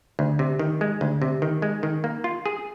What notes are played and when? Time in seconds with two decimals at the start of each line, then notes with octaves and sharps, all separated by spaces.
0.19 D2
0.39 C3
0.59 D#3
0.81 G#3
1.01 D2
1.22 C3
1.42 D#3
1.62 G#3
1.83 D#3
2.04 A#3
2.24 F4
2.46 G#4